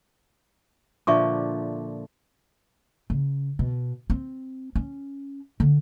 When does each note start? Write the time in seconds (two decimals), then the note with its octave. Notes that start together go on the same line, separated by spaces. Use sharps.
1.07 A#2 D3 F3 E5 C#6 D6
3.10 C#3
3.59 B2
4.10 C4
4.76 C#4
5.60 D3